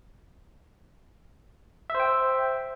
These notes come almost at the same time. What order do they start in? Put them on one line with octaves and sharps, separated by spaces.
E5 C5 G5